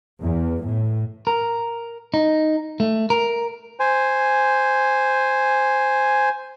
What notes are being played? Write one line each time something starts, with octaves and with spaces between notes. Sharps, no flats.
E2
A2
A#4
D#4
A3
A#4
C5 G#5